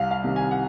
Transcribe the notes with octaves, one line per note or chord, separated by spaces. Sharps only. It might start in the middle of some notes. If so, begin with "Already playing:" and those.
Already playing: C2 F5
F5
C3 D#3
G#5
F#5